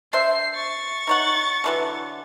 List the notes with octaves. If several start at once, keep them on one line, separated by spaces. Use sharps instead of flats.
D4 C5 E5 C7
C#6 A6
D#4 C#5 F#5
D3 E3 F#3